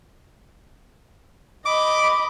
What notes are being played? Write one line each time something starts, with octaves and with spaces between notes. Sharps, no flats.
D#5 B5 D6